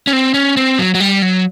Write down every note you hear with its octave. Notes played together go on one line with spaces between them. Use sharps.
C#4
C4
C#4
C4
F#3
F#3
G3
F#3